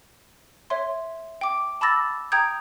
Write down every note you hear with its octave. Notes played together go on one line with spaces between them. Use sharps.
C#5 E5 C6
G5 D6
A5 B5 D6 E6 A6 A#6
G5 A#5 D#6 G6 G#6